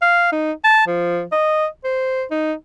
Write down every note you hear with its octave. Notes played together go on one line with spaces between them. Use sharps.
F5
D#4
A5
F3
D#5
C5
D#4